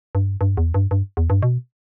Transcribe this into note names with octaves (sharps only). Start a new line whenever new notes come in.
G2
G2
E2
G2
G2
E2
G2
B2